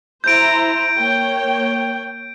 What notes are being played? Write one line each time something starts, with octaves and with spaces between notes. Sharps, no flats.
E4 C5 A#5 G6 D7
A#3 C#5 G5